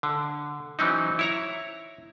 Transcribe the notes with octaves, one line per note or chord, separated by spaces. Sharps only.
D3
E3 F#3 C4 C#4 D#4
E4 C#5 A#5